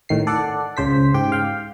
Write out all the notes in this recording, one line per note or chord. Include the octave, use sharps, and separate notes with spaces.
A2 D#3 C7
A4 D5 F#5
C#2 C#3 C5 B6
G#2 G4 G5
F5 G5